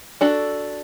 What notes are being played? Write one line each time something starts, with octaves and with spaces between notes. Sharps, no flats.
D4 F#4 A4